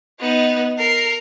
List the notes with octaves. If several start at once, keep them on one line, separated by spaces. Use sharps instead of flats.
B3 D#4
A#4 C7